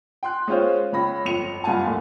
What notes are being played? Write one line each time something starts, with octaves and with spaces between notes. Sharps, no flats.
G5 C6 F#6
G#3 C#4 F4 C5 C#5
C#2 C#5 B5 A#6
G1 F2 C#7 F7
F#1 G2 F4 F#5 G#5 A5
D#2 A2